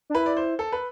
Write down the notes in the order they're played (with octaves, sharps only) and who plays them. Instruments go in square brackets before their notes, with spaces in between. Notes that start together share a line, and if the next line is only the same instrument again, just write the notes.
[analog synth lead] D4
[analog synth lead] E4 [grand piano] B4
[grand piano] D5
C5
A4
B4